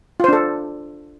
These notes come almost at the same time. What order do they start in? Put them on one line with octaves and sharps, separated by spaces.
F4 C5 D4 A4